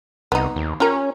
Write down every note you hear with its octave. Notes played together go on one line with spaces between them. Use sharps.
C2 B3 D#4
D#2
C#4 F4 G4 A#4